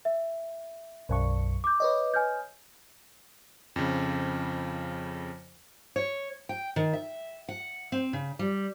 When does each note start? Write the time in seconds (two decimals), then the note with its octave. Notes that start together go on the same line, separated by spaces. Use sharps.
0.05 E5
1.09 B1 F#2 C#6
1.64 D6 G6
1.80 B4 C#5 D#5
2.14 G#5 F6 G6
3.76 F2 C#3
5.96 C#5
6.49 G5
6.76 D#3
6.93 E5
7.49 F#5
7.92 C4
8.13 C#3
8.39 G3